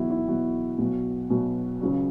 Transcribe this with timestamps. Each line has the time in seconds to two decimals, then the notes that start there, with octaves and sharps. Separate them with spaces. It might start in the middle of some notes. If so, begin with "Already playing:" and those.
Already playing: E2 B2 F#3 E4 F#4
0.10 E4
0.28 E2 B2 F#3 F#4
0.78 B1 B2 F#3
1.30 B1 B2 F#3
1.81 C#2 C#3 F#3